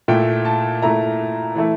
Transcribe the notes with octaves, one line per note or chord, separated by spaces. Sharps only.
A#2 A3 E4 G5
A5
A#2 A3 E4 A#5
E3 A3 E4